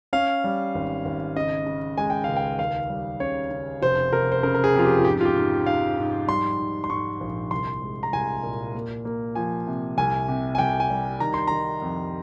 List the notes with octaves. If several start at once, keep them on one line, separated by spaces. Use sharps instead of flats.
C#4 F5
G3
G#1
G#1
C#3 D#5
C#3
G#3 G#5
G5
C#2 F5
G5
D#2 F5
G3
C#3 C#5
C#3
F1 C5
F1 A#4
C5
C#3 A#4
A#4
G#4
F2 F4
G4
F4
G#2 G4
F4
G4
G#2
G#2 F5
G#2
G3 C6
G#2
C6
G#2 C#6
A#1
C2 C6
G#3
A#5
C2 G#5
A#2
A#3
A#3
F3 G#5
C3
C2 G#5
C3
G#5
C2 G5
G#5
G3
D#3 A#5
C6
D#3 A#5
F2